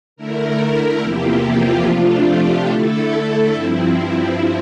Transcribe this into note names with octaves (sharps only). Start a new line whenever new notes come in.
D3 A3 E4 A#4
A#4
E2 C3 F3 A#3 E4 G4
F4
C3 F3 A3 D4 F4
G4
D3 A3 E4 A4
G2 F3 C4 E4